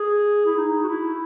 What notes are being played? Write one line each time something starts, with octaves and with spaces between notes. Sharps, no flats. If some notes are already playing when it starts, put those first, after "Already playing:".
Already playing: G#4
E4
D#4
F#4
E4